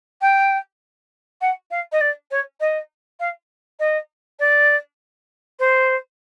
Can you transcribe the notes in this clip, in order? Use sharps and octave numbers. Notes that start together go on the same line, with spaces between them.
G5
F#5
F5
D#5
D5
C#5
D#5
F5
D#5
D5
C5